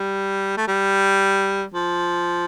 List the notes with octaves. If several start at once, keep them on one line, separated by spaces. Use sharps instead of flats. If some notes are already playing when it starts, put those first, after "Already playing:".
Already playing: G3
A3
G3
F3